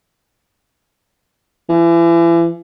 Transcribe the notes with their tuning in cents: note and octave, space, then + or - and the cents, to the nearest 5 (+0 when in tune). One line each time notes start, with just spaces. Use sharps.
E3 +35